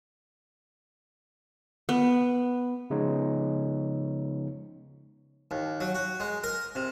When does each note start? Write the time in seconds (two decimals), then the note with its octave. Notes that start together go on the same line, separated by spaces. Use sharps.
1.89 B3
2.90 C#3 F3 G#3 B3 D#4 C#5
5.51 D#2
5.81 F#3
5.95 F#4
6.20 G#3
6.44 A#4
6.75 C3